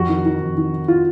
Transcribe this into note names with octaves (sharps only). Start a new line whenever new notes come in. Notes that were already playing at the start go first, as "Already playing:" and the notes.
Already playing: F2 F#4
D#3
D#3
F2
D#3
D#3
F4